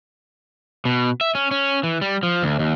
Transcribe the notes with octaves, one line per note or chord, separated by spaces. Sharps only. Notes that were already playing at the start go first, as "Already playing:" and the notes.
B2
E5
C#4
C#4
E3
G3
F3
D2
D#2